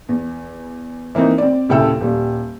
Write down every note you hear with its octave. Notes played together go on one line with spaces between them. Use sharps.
E2
E3 A#3 C4 D#4
C4 D5
D#1 C#3 E4 A4 G5 E6
D#1 G3